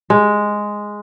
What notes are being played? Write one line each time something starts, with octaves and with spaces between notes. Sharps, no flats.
G#3